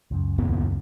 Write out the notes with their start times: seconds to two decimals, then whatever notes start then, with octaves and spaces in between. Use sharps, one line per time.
0.11 C#2 F#2
0.38 D#2 A#2 B3